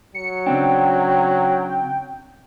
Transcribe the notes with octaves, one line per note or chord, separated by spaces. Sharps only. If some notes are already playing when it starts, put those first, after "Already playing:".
F#3 C#7
C#3 C4 D4 G5